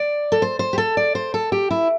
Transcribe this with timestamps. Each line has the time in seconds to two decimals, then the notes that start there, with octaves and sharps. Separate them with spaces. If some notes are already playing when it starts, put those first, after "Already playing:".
Already playing: D5
0.32 A4
0.42 C5
0.59 C5
0.73 G4
0.78 A4
0.97 D5
1.15 C5
1.34 A4
1.52 G4
1.71 E4